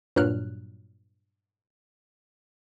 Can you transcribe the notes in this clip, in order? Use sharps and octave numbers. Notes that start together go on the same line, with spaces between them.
G2 A#2 F#3 F6 F#6